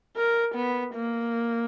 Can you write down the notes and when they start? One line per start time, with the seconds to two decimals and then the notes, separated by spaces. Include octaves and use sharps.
0.16 A#4
0.55 B3
0.95 A#3